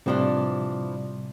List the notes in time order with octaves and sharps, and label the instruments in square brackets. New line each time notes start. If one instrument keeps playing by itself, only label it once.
[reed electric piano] A2 C3 G3 [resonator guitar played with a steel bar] E3 F3 D4